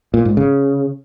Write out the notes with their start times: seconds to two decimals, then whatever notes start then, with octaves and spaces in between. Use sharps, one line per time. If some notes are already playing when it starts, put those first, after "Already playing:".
0.14 A#2
0.25 G#2
0.37 C#3